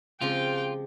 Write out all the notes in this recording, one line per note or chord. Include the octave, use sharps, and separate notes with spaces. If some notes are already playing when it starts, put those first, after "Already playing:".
C#3 F3 G#3 C4 F4 G4 G5